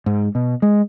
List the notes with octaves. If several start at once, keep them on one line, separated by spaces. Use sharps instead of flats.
G#2
B2
G#3